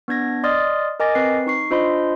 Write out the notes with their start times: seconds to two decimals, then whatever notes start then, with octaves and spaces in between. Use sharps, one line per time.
0.08 B3 D4 G#6 A#6
0.44 D5 D#5 C6 D#6 F6 A6
1.00 A#4 D#5 G#5 D6 A6 A#6
1.15 C4 B4 C7
1.47 D#4 C#6 C7
1.70 D4 F4 C5 D#5 B5 C6